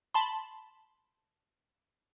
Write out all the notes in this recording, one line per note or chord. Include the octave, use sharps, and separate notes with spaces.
A5 B5 C6